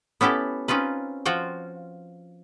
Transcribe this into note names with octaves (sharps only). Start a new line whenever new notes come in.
B3 C#4 E4 G4 A4
C4 C#4 D#4 F4 B4
F3 F4 F#4 G5